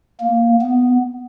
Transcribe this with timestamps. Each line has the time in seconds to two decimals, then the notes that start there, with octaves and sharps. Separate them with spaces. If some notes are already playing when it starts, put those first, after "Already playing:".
0.20 A#3
0.61 B3